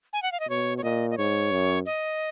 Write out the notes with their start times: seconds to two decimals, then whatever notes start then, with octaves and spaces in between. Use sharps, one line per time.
0.13 G#5
0.22 F#5
0.32 F5
0.40 D#5
0.49 B2 C#5
0.78 C#5
0.83 A#2 D#5
1.10 D#5
1.18 G#2 C#5
1.51 F#2
1.86 D#5